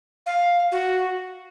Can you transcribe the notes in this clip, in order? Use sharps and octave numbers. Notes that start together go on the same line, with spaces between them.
F5
F#4